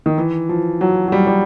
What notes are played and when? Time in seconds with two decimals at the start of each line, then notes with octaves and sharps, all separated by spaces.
0.06 D#3
0.18 E3
0.49 F3
0.81 F#3
1.08 F#3
1.12 G3
1.27 G3